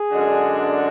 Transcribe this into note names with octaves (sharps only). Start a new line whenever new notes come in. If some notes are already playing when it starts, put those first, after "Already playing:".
Already playing: G#4
F#2 D3 G#3 D4 F#4